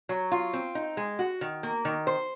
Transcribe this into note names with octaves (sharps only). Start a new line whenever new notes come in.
F#3
F4
C4
D#4
G#3
F#4
D#3
A#3
D#3
C5